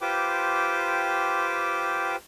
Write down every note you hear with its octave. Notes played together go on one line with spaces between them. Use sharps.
F4 G4 B4 C5 G5 D6